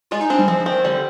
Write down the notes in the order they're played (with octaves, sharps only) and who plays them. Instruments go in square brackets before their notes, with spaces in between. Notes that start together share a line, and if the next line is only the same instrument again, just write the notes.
[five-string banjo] G#3 [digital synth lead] F4
[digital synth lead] D#4
[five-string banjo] C4 [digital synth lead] D4
[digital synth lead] G3
[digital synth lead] F3 [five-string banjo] C4
[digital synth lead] F3
[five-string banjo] C4
[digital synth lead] D#3
[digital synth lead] D3 [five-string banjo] G3